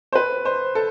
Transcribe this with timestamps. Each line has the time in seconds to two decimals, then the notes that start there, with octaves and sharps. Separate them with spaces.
0.13 C5
0.15 B4
0.45 C5
0.75 A4